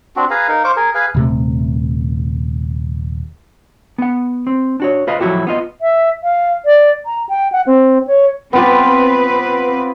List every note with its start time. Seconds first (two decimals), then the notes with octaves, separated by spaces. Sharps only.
0.16 C4 D4 F#4
0.30 G#4 B4 F5 A#5
0.48 D#4 A#4 F5
0.64 C5 F5 C#6 D6
0.76 G#4 A#4
0.95 G#4 B4 F5 G#5
1.15 D#1 C3 A3
3.98 B3 F#5
4.47 C4
4.80 D4 F#4 C#5
5.07 F4 B4 D#5 F5
5.20 F3 F#3 E4 F#4 G4 A4
5.47 B3 F4 D#5
5.82 E5
6.24 F5
6.65 D5
7.06 A#5
7.29 G5
7.52 F#5
7.67 C4
8.07 C#5
8.53 B3 C4 F4 G4 B4